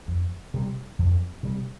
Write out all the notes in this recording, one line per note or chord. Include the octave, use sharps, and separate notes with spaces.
F2
C3 G3
F2
C3 G3